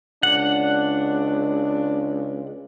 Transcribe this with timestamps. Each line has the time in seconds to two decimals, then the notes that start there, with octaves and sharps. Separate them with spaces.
0.23 C#2 D4 F#5